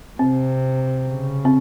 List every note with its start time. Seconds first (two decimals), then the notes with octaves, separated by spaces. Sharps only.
0.19 C3 C4
1.09 C#3
1.45 C4